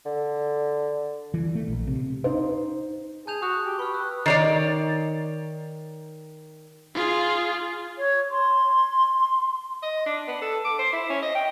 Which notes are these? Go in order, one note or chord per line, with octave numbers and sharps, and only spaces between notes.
D3
E3
A3
A#1
C3
D#4 C5
G#4 A5 G6 F7
F#4 D#6 F#6 G6
G4 F7
B4 C#6 F6
E6 F#6
D#3 C#5 D5
F4 G#4
C#5
C6
D#5
D4
B3
A4
D6
C5
E4
C#4
D#5
G5